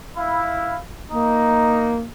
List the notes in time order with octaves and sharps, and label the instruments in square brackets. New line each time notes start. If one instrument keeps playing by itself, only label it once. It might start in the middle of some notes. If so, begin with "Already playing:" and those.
[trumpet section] E4 [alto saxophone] F5
[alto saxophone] A#3 [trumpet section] D#4